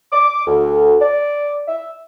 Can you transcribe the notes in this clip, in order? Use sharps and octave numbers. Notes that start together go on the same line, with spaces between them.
D6
D2
D5
E5